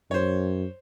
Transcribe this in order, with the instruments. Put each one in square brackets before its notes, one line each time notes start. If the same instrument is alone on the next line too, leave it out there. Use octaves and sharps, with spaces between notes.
[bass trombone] F#2 [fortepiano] C5 C#5